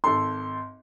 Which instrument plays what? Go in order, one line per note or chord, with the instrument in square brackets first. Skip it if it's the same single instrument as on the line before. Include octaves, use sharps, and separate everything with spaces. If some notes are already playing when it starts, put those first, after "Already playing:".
[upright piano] G#1 A4 C6